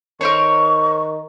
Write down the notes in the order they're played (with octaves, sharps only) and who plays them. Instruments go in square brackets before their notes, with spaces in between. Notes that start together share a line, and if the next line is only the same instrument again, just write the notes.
[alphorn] D#3 [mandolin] A#4 C5 C#5 [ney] C#6